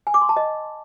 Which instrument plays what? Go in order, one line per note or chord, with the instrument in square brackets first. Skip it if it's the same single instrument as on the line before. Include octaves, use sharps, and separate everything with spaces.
[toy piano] G#5
D6
C6
A5
D#5